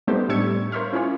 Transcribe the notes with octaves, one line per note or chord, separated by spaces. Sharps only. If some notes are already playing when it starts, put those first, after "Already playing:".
G3 A3 B3 D#4 G4 C5
A2 G3 D4 E5 C#6 G#6
A#4 C5 C#5 E5 F5
C#4 E4 F4 G#4 C#5